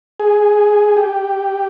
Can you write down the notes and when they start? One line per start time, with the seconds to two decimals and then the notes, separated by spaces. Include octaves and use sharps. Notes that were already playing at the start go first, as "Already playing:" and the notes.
0.20 G#4
0.97 G4